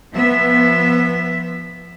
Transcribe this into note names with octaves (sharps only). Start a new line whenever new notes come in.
F3 B3 E5